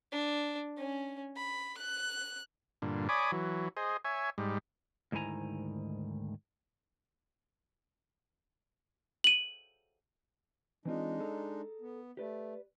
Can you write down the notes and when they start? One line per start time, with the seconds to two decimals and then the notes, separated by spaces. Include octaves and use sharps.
0.12 D4
0.77 C#4
1.36 B5
1.78 F#6
2.82 G2 A#2 D3
3.09 C#5 D5 G#5 B5 D6 D#6
3.32 E3 F#3
3.77 G#4 C5 D#5
4.05 C#5 E5 G#5
4.38 G#2 G3
5.12 D2 G#2 D#3 E4 G#5 A#5
9.24 D#7 F#7
10.85 E3 G#3 C4 D4 D#4 F4
11.20 G#4 A4 A#5
11.81 B3
12.17 A3 G4 B4 D5